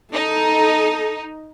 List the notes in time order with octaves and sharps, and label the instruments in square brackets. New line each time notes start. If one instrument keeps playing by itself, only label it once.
[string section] D#4 [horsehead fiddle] A4